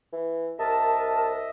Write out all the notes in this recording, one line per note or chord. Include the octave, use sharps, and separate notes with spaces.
E3
C2 A#4 D#5 E5 A5